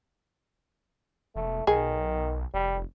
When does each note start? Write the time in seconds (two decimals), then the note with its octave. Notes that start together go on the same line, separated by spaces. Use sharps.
1.35 E1 A3
1.67 B1 D#3 G#4
2.54 F1 G3